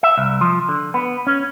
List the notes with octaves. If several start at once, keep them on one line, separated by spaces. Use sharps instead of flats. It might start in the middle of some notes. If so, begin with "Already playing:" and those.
E5
C2
F3
D3
B3
C#4